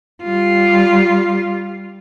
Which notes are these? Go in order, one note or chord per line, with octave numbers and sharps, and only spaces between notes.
G3 F4